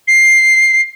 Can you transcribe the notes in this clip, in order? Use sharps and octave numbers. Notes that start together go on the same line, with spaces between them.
C7